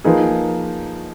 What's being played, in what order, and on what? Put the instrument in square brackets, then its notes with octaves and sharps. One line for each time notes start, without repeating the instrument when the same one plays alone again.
[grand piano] F3 A#3 D#4 G#4 B4